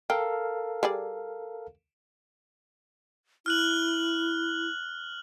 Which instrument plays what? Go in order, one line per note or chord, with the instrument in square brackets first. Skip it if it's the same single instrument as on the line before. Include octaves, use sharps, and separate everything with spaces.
[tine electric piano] A4 A#4 F5 [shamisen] G5
[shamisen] G3 G#4 D5
[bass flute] E4 [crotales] F6 F#6 F#7